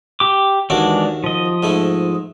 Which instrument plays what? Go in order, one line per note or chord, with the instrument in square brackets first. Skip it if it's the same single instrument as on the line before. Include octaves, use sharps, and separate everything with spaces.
[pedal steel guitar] G4 D6
[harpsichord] D#2 F#4 D6 [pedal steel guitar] E3 G#3 D4
[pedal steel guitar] F3 D#5
[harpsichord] G#2 A3 E4